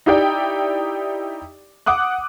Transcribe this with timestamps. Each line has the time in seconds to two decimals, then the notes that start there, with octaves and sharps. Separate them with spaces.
0.06 D#4 E4 G4 D5 G5
1.86 F#5 D6 D#6 F#6